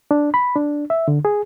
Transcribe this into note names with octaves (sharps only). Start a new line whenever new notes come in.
D4
B5
D4
E5
D3
G#4